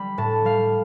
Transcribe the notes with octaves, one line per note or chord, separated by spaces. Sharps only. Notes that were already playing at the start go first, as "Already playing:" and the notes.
Already playing: G3 B5 D6
A2 A5
G3 F5